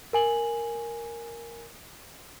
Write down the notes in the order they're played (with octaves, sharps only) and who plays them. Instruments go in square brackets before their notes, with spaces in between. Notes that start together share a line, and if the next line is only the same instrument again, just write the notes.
[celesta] A#4 G#5 F#7